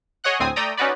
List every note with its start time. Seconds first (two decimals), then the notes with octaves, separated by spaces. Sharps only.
0.24 G#4 C#5 D#5 F#5 F#6
0.40 D2 A2 C4 G#5 D#6
0.56 A3 D5 G5 A#5 D#6
0.77 C#4 D#4 F#4 B4 D5